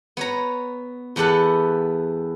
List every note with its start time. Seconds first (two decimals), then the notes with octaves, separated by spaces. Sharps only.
0.17 B3 C#5 A#5
1.16 E2 B3 G4 A4 F#5